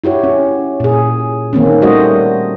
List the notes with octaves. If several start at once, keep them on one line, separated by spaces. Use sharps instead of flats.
E4 F#4 G4 C#5
C#4
A#2 G#4
D#3 A#3 C4 C#4
G3 A3 F#4 C5 D#5